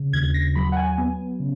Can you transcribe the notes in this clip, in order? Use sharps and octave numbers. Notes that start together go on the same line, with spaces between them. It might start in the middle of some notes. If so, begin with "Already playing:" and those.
Already playing: C#3
D#2 G#6
A#6
F#3 B5
F#5
G#5
B3
C#3